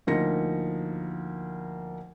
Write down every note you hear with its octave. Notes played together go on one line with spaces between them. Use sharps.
D2 F3 A#3 D#4 A#6 C#7